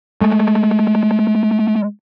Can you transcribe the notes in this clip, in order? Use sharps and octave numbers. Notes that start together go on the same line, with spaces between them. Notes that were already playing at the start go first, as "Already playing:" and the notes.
G#3 A3